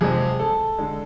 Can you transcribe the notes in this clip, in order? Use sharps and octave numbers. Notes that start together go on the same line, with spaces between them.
F2 C3 G#3 G#4
A4
D3 G#3